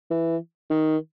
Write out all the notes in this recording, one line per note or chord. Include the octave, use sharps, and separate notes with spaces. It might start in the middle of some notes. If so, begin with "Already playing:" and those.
E3
D#3